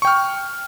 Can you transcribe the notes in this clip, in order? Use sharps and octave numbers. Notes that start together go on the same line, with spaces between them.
G5 C#6 F6